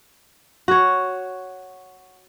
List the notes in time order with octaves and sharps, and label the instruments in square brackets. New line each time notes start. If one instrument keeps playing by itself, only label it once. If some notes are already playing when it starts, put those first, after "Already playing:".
[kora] F#4 C#5